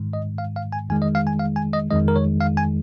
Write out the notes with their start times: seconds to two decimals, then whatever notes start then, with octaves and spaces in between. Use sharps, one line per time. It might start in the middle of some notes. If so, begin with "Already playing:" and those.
Already playing: G#2 D#3 G#3
0.13 D#5
0.38 F5
0.56 F5
0.73 G#5
0.89 F2 D#3 G#3 G#5
1.02 D#5
1.15 F5
1.27 G#5
1.39 F5
1.56 G#5
1.73 D#5
1.91 F2 D#3 G#3 D#5
2.08 A#4
2.16 C#5
2.41 F5
2.57 G#5